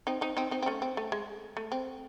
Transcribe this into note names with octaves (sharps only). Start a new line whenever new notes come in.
C4 D#4
C4 D#4
C4 D#4
C4 D#4
C4
A3 C#4
C4
A3
G#3
A3
C4